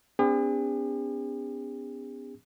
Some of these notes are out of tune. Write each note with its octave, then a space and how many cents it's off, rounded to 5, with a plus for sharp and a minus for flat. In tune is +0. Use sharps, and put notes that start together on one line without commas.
B3 +35 D4 -40 G#4 -45